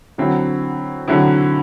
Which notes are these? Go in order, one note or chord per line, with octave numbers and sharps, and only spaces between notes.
D3 F#3 C4 E4
D3 F#3 C4 E4